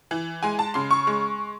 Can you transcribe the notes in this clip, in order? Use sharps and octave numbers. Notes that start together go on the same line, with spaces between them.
E3
G#3 G#5
A5
C#3 C6
C#6
G#3